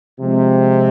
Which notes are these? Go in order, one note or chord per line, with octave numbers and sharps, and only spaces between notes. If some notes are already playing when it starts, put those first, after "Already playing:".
C3 F3 G#3 C4